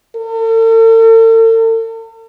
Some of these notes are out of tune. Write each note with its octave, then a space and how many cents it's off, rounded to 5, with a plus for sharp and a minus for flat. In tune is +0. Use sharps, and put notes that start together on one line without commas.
A4 +45